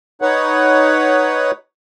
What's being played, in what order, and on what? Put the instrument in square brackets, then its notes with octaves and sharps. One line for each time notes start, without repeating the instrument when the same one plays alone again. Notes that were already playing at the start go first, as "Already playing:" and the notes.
[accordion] D#4 B4 C#5 F#5